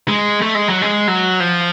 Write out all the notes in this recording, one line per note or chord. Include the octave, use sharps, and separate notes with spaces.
G#3
A3
G#3
F#3
G#3
F#3
F3